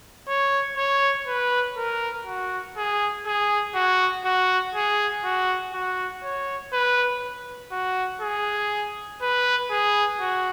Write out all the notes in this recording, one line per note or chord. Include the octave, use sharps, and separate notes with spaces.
C#5
C#5
B4
A#4
F#4
G#4
G#4
F#4
F#4
G#4
F#4
F#4
C#5
B4
F#4
G#4
B4
G#4
F#4